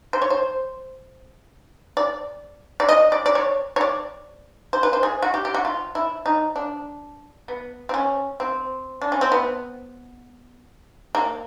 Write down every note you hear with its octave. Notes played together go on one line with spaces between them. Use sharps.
C5
C#5
C5
D5
D5
D#5
D5
D5
C#5
C#5
D5
C5
B4
C5
G#4
F#4
G4
G4
F#4
F4
E4
D#4
D4
B3
C4
C#4
C4
D4
C#4
C4
B3
A#3